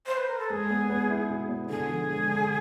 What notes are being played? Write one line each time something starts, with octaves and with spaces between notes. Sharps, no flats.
C5
B4
A#4
A4
G#3 G#4
B3
B3
E4
B2
B3
D3 G#4
F3
G#3
D3